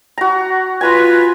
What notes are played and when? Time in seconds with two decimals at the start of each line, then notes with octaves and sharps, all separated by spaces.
0.18 F#4 A#5
0.81 F4 B4 G#5 A#5 C6